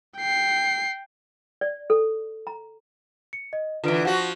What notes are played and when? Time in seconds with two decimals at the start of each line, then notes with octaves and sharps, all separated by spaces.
0.17 G5 C7
1.61 D5
1.90 A4
2.47 A#5
3.33 C#7
3.53 D#5
3.84 D3 E3 F4 B4 D7
4.05 F3 F#4 F#5